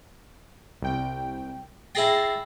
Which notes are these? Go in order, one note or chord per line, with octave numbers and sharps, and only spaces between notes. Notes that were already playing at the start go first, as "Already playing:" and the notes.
C2 G5
E4 G#4 G5 A6 A#6 C7